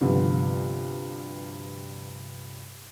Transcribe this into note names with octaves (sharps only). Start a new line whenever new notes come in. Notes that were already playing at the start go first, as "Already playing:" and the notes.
D2 G2 C3 F3 B3